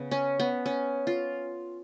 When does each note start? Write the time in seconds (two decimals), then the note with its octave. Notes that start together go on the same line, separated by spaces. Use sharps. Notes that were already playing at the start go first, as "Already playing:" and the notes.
Already playing: C#3 B3
0.11 C#4
0.39 B3
0.66 C#4
1.07 F4